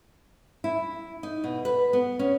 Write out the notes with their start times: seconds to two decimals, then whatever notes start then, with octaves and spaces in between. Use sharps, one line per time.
0.64 E4
1.23 D#4
1.44 B2
1.65 B4
1.93 B3
2.19 C#4